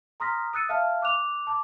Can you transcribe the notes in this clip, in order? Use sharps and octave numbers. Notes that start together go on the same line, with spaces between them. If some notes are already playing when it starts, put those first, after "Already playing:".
A#5 C6 D#6 F6 A#6 B6
D#6 E6 F#6 A6 C#7 D#7
E5 F5 A5 F6
D6 F#6 F7
A5 D6